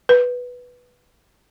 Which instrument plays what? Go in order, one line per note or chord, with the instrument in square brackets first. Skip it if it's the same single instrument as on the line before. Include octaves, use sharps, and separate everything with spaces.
[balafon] B4